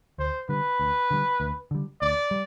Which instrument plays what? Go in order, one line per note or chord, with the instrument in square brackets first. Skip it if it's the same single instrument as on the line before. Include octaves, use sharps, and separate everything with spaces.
[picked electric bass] D2 [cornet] C5
[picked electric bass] D3 G3 [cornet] B4
[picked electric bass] D2
D3 G3
D2
D3 G3
[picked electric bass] D2 [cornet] D5
[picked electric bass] G3